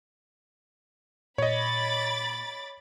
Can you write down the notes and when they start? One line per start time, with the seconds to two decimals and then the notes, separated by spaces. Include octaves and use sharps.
1.38 A#2 C#5 D#5 B5 D6 A6